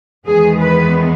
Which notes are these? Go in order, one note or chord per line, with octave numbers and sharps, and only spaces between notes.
E2 D#3 G#3 B3 G#4
B4